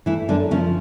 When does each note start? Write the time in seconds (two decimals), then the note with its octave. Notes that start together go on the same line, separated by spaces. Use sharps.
0.06 E3 A3 E4
0.28 F#2 D3 D4
0.51 C#3 F3 C#4